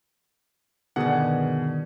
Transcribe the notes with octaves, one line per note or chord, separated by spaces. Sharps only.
G2 B2 D3 D#3 B3 G#4 D5 F#5